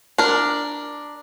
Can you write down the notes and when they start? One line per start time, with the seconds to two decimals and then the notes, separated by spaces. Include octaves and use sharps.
0.18 D4 A#4